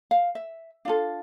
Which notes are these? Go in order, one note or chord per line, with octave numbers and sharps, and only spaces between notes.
F5
E5
D4 F4 A4 F5